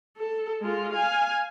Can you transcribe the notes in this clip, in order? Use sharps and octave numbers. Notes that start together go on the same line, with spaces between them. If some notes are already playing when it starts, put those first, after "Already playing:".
A4
G#3 F4
F5 G#5